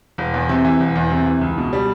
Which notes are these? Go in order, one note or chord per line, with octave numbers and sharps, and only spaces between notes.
E1
E2
C3
E3
E1
E2
C3
E3
C#2
B2
G3